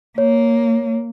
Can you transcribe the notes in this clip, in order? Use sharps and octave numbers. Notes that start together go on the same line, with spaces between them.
A#3 C#5